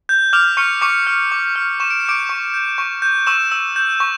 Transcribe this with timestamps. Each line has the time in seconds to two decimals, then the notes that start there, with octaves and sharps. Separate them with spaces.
0.09 G6
0.33 D6 F6 F7
0.57 C#6 F6 C#7
0.81 C#6 D6 C#7
1.07 F6
1.32 D6
1.56 F6
1.80 C#6 E7
1.90 D7
2.00 C#7
2.05 D6 G6 D7
2.29 C#6
2.54 G6
2.78 C#6
3.02 G6
3.27 C#6 E6 E7
3.52 E6
3.76 G6
4.00 C#6